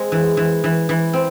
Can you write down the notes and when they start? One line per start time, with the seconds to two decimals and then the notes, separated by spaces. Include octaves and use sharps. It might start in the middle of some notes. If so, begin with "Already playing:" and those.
Already playing: G#3 C4
0.12 E3
0.37 E3
0.64 E3
0.89 E3
1.13 C4